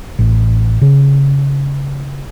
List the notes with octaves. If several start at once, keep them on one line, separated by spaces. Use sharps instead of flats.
A1
C#3